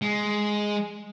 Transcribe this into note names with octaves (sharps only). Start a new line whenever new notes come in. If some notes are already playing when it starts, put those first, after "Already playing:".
G#3